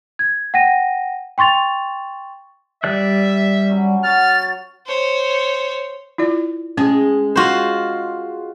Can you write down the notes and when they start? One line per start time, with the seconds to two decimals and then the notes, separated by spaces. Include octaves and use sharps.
0.19 G#6
0.54 F#5 G5 A#6 D#7
1.38 G5 C6 C#6 A6 F7
2.84 G3 D5 E5 F#6
3.69 F#3 C#4 C#6
4.04 F#4 F6 A6
4.86 C5 C#5
6.18 E4 F4 D5
6.77 G#3 C#4 G#4
7.36 F4 F#4 C5